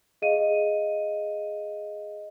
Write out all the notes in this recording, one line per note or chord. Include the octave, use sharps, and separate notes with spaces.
G#4 D#5 F5 D#7